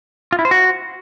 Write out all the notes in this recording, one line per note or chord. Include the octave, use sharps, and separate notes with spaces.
F4
E4
C5
F#4